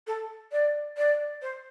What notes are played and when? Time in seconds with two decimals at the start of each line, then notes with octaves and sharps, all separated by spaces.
0.07 A4
0.52 D5
0.97 D5
1.42 C5